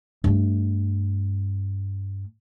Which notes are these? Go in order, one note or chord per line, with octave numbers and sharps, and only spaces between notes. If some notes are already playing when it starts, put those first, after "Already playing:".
G2 A3